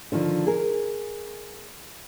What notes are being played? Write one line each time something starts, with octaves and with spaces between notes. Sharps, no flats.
D3 D#3 F3
G#4 A#4